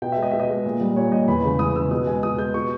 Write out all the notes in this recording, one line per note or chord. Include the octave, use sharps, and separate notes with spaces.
B2 G5
E5
G#3
D#5
B2 E5
D#5
G#3
A#2
G3
A#2 C#5
G3 D#5
E2 B5
C#3 G#3 B5
E2 D#6
C#3 G#3 E6
B2 D#6
G#3 G#5
B2 D#6
G#3 G6
B2 C#6